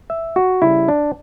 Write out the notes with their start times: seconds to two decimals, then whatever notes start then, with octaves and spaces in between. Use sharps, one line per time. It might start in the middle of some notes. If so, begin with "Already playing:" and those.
0.10 E5
0.36 F#4
0.62 C#3 G3 E4
0.88 D4